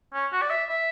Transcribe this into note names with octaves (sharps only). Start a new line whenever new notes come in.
C#4
F#4
D5
E5
E5